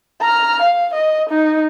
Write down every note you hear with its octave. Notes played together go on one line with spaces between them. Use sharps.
A#5 F6
F5
D#5
D#4